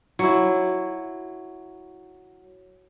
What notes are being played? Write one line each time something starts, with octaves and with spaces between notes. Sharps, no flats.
F#3 E4